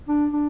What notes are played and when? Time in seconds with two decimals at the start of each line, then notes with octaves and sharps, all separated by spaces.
0.08 D4
0.33 D4